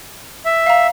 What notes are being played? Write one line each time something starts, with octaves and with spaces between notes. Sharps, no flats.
E5
F5 A#5